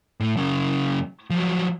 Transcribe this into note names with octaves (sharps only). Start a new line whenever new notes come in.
A2
F#2 C#3
F3 F#3